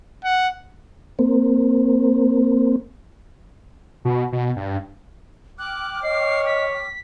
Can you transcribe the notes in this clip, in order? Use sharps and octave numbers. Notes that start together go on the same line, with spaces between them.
F#5
A#3 C4
B2
B2
G2
G5 D6 F6 F#6
C#5 D#5 C7
B6